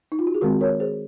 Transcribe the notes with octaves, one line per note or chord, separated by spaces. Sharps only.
D#4
F4
F#4
G#4
D#3 G#3 C4 F#4 A#4
A#4 C#5
G#4 C5